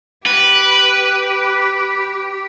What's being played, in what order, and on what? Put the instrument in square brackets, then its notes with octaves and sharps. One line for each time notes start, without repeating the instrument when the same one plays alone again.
[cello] G4 [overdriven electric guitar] B4